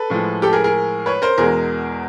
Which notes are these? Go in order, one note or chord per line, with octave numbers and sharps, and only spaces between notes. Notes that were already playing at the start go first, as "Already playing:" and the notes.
Already playing: A4 B4
A2 F3 G#3
G4 A4
G#4 A#4
G#4 A#4
B4 C#5
A#4 C5
E2 B2 G#3 G#4 A#4